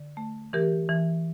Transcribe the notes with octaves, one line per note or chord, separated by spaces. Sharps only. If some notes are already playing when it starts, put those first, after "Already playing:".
Already playing: D3
A3
E3 G4 A#4
E3